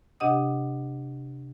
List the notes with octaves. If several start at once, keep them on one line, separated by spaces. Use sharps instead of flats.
C3 D4 G4 D#5 F#5 D#6